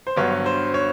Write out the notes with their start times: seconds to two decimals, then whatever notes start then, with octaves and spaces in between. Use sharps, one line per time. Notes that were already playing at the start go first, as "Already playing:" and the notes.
0.07 C5
0.16 G2 D3 F#3 B3 C#5
0.46 C5
0.74 C#5